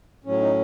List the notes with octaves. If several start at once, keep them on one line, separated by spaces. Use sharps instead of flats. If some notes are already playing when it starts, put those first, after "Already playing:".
A2 F#3 C#4
D#4